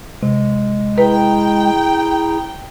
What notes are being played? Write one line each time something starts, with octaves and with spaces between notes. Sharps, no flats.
C3 G#3
E4 G#4 B4 G5 A#5